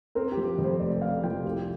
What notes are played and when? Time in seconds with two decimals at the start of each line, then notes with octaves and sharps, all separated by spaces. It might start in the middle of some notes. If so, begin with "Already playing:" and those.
0.15 C4 A#4
0.32 G4
0.37 F3
0.48 G4
0.58 F2
0.64 C5
0.80 F1 D5
1.02 C4 F5
1.23 F3 G5
1.45 C2